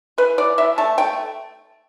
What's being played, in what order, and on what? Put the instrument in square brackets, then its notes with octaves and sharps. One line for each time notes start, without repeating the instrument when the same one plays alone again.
[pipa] E3 B4
E3 D5
E3 E5
A3 A5
A3 G5